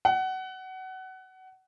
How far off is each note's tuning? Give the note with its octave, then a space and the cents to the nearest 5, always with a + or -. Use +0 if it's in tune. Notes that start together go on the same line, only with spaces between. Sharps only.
F#5 +25